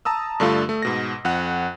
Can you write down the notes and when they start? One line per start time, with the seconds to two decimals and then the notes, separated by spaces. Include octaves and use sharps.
0.05 A5 A#5 D#6 E6
0.40 G2 D3 A3 F4
0.69 A3
0.82 G#2 B2 A#6
1.25 F2 F#5 F#6